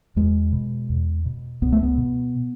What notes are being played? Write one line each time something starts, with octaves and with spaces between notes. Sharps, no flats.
E2 G#3
B2
E2
B2
C#2 B3
A3
B3
B2